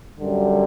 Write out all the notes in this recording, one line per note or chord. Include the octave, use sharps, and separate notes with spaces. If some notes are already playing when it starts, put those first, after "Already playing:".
F#2 D3 G3